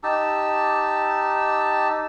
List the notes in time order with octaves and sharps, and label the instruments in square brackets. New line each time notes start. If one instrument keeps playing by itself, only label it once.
[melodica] D#4 G4 A5 E6